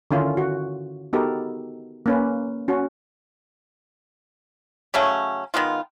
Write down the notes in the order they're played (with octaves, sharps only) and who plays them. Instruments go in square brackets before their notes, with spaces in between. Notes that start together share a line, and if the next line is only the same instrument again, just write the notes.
[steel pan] D3 D#3 C#4 E4 F4 A#4
F#4
B3 D#4 F#4 G4 A4 A#4
A#3 C#4 B4
C#4 F#4
[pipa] C#3 F#3 A3 C#4
D#3 G#3 B3 F4